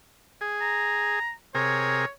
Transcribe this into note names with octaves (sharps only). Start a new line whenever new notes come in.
G#4
A#5
C3 G#4 A#4 C#5